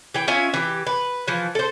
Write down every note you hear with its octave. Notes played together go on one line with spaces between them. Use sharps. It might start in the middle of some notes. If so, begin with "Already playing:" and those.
E3 G5
C#4 F4 E5 G#5
E3 G4
B4
E3 F3
A4 C5